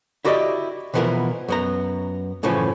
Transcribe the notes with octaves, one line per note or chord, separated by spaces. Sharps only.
E4 F#4 G4 A#4 D5 D#5
B2 E3 F3 B3 E4 A#4
F#2 B3 A#5
F#2 A2 C#3 E3 F3 C#4